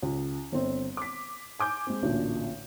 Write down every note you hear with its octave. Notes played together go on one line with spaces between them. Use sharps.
C#2
G1 C4
D6 B6
G#5 D6 G6
G#3 C4
A1 D2 A#2 D3